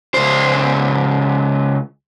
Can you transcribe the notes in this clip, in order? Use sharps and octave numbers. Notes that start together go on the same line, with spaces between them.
C#2 C5